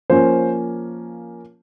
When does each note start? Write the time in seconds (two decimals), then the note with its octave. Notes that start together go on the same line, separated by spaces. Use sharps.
0.10 F3 A#3 C#4 C5